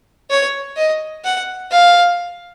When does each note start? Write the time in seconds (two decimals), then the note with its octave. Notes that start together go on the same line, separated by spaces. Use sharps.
0.30 C#5
0.77 D#5
1.24 F#5
1.71 F5